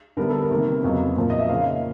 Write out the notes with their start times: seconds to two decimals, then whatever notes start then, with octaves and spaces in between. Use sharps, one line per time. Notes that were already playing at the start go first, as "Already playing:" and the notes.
0.17 D3 G3 B3 E4 A#4
0.30 A4
0.42 A#4
0.50 C3 D#3 G3 A#3
0.83 F2 C#3 F#3 B3 D#4
1.16 A#2 F3 A#3
1.30 D#5
1.39 E5
1.49 C#3 F3 A#3 D#4 F5